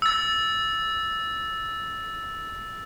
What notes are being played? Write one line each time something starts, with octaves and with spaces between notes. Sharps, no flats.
E6 A6